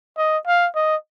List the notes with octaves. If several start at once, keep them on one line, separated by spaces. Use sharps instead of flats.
D#5
F5
D#5